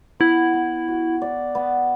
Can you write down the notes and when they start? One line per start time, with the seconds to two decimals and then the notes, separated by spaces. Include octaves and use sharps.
0.20 B3 E4
0.53 B3
0.88 F#4
1.22 D5
1.55 B3